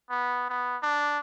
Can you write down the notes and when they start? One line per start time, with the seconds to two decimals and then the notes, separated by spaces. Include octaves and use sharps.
0.10 B3
0.50 B3
0.82 D4